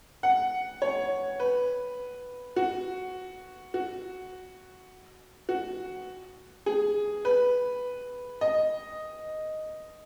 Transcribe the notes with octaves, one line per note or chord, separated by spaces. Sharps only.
F#5
C#5
B4
F#4
F#4
F#4
G#4
B4
D#5